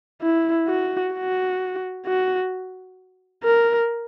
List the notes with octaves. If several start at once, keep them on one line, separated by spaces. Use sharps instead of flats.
E4
F#4
F#4
F#4
A#4